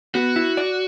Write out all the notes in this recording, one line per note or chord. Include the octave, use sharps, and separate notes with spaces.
B3 F#4
E4
D5